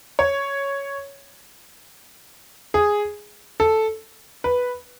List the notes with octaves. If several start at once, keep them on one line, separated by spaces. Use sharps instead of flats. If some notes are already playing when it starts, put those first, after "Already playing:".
C#5
G#4
A4
B4